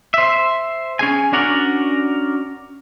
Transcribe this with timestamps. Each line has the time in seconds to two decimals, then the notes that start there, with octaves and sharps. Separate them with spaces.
0.14 C5 E5
0.99 C#4 G#4 G#5
1.33 C#4 D4 F#4 A#4 D5 F#5